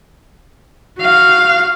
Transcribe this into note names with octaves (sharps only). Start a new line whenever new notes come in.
F#4 F5